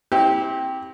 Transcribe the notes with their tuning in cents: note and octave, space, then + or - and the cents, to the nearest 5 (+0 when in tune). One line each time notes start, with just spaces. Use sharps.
C4 +25 E4 -30 G4 +0